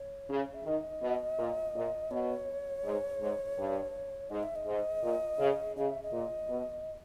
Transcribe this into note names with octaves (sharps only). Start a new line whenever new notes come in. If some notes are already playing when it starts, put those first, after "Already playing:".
Already playing: C#5
C#3
E5
D#3 D#5
B2
A#2
A#2
B2 C#5
G#2
G#2
G2
G#2 D#5
E5
D#5
G#2
A#2
C#3
C#3 D#5
E5
D#5
A#2
B2